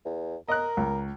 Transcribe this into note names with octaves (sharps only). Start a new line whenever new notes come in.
E2
A#4 D#5 F#6
C#2